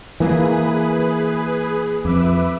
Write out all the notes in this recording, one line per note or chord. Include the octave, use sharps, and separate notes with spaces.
E3 A#3 G#4 B4
F2 B4 E5 D6